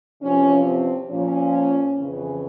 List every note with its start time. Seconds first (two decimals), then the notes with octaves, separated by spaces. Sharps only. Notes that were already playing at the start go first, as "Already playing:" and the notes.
0.22 E2 C3 F3 C#4
0.65 C4
1.09 A#2 F3 C#4
1.95 F2 C#3 E3